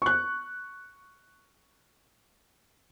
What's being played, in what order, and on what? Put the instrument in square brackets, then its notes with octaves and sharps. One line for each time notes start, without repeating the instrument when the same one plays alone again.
[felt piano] C#6 F#6